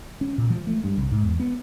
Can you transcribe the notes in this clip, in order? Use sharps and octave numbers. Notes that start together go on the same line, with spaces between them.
C#4
A#2
F3
A3
G2
C2
G#2
E2
B3